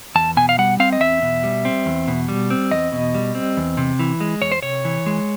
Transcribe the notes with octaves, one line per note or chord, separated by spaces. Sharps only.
E2 A5
B2 G#5
F5
G3 F#5
C4 F5
D#5
E2 E5
B2
G3
C4
E2
B2
G3
C4
E2 D#5
B2
G3
C4
E2
C3
E3
G#3
E2 C#5
C5
C3 C#5
E3
G#3